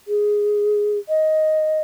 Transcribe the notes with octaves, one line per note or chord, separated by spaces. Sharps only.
G#4
D#5